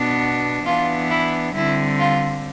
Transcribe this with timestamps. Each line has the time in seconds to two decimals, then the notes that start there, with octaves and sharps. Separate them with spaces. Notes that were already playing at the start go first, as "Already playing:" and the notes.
Already playing: B2 B3 D4
0.66 E3 B3 D4 F4
1.10 E4
1.55 D3 G3 C4 E4
1.99 F4